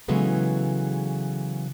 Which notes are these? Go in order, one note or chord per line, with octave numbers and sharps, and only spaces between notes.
C#3 E3 F#3 G#3 A3 B3